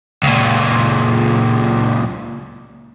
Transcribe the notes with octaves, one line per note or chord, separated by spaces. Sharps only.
C#2 A#2